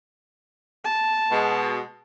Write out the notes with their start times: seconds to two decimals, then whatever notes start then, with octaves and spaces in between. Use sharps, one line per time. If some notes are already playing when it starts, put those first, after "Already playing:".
0.84 A5
1.31 B2 G#3